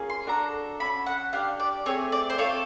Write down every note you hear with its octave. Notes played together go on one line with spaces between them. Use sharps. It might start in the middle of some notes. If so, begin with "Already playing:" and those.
Already playing: A#3 C#4 F4 G#4
C6
D4 F#4 A4 A#5
C#4 F#4 A4 B5
F#5
D4 G4 F5
D5
A3 C4 G#4 C#5
D5
C5
C4 F4 A4 C#5